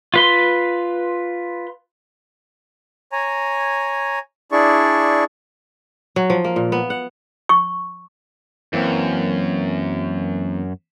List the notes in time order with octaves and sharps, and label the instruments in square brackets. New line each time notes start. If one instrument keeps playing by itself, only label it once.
[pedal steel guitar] F4 B4 C6
[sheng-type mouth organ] C#5 G#5 A#5
D4 E4 G#4 D5 C#6
[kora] F#3
F3
A#3
A#2
B3
F#5
[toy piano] C#6
[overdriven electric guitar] F#2 [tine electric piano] E3 A#3 C4